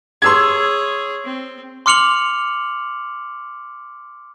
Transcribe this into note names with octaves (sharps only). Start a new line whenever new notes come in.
G#4 C#5 C6 E6 G#6
C4
C6 D6 F6 C#7 F7 F#7